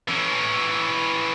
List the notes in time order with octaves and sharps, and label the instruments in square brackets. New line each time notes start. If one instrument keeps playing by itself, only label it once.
[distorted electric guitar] E3 C#4